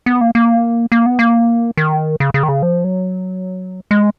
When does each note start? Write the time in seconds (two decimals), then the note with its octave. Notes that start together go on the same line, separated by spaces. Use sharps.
0.06 B3
0.21 A#3
0.35 A#3
0.92 A#3
1.06 B3
1.19 A#3
1.77 D#3
2.20 C#3
2.34 C#3
2.43 D#3
2.49 C#3
2.63 F3
2.84 F#3
3.91 G#3